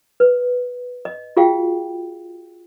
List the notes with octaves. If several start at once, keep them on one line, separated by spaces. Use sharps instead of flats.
B4
D#5
F4 F#4 G#4 F5 G5